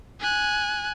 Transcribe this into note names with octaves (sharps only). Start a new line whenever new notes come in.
G#5 F#6